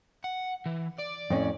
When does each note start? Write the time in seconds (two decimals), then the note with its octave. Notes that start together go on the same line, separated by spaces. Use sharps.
0.24 F#5
0.66 E3
0.98 D5
1.30 F2 A2 C#4